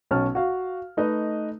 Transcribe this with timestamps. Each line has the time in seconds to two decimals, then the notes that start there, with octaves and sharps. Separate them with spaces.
0.11 B1 C#4 A5 F6
0.35 F#4 F5
0.97 A3 D#4 B4 D#5